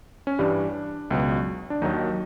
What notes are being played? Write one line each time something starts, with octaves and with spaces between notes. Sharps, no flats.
C#4
G2 E3 G3 D4
C#2 B2 F#3
D4
D#2 D#3 F#3 D#4